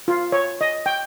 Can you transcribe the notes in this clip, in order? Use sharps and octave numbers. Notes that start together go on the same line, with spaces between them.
F4
C#5
D#5
G5